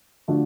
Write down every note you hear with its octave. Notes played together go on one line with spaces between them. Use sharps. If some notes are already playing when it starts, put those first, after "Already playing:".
D3 F3 A3 D4 F#4